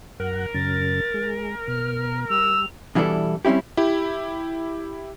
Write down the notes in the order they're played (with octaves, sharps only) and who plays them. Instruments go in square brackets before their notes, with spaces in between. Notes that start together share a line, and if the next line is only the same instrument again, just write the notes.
[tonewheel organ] F#2 F#5 [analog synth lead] A#4
[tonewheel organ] F#2 C#3 [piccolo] A6
[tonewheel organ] G#3
[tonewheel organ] B2 [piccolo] F6
[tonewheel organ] G3 [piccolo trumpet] E6 [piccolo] F7
[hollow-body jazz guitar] B2 E3 G3 D4 E4 A4
G3 C4 C#4 E4 G4
[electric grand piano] E4 G4